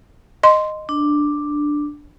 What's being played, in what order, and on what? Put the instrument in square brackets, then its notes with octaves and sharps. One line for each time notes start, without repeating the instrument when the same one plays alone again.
[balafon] D#5 C6
[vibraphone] D4